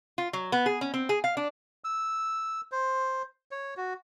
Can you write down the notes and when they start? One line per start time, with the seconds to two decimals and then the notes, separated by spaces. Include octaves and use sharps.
0.18 F4
0.33 F#3
0.52 B3
0.66 G#4
0.81 C#4
0.94 C4
1.09 G#4
1.24 F5
1.37 D4
1.84 E6
2.72 C5
3.51 C#5
3.77 F#4